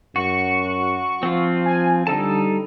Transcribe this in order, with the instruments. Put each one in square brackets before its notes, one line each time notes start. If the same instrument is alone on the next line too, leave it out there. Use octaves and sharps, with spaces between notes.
[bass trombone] F#2 [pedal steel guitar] F#4 [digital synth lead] C#6
[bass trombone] F3 [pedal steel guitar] C4 F4
[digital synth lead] G#5
[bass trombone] D3 [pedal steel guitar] G3 D#4 A5 [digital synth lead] A4